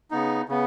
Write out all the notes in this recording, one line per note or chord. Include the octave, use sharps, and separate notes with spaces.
C#3 B3 D#4
C#3 B3